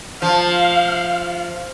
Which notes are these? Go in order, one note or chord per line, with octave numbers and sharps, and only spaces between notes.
F3 F5